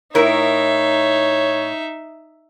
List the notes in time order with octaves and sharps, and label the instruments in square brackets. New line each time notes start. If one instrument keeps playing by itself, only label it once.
[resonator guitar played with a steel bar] A2 E4 A#4 [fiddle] D#4 E5 [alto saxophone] C#5